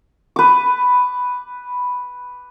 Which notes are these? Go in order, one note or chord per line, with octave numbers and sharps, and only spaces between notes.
B4 D6